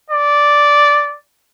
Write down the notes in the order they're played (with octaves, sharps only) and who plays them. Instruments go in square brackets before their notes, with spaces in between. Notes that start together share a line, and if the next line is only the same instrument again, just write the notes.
[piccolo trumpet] D5